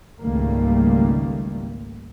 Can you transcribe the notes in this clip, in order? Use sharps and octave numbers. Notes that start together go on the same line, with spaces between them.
G#1 C#2 D#3 G3 A3 A#3